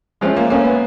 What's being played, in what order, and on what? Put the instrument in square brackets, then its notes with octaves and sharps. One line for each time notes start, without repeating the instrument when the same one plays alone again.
[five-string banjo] F3 A3 C#4 [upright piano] G#3
[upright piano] A#3
[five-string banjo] F3 A3 C#4 [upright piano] A#3
[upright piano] B3